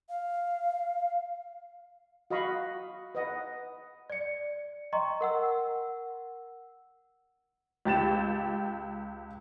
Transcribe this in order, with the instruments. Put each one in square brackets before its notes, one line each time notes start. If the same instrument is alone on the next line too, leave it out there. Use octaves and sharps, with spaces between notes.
[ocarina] F5
[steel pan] F#4 D#5 F5 B5 C#6
B4 D#5 F#5
[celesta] D5 C#7
D#5 G5 A#5 C6 C#6
A#4 F#5 E6
[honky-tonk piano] C#2 G4 A6 E7